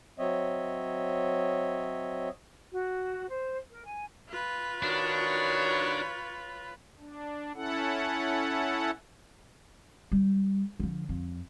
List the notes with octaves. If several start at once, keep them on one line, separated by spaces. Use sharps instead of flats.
F#3 C4 C#5 D#5 E5
F#4
C5
A#4
G#5
F4 B4
D#3 D4 F#4 C#5
D4
C#4 E4 A4 F#5
G3
D3 F3
F2